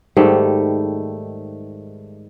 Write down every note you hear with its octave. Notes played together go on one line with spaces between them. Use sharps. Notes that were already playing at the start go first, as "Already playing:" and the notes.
G#2 D#3 G3 A3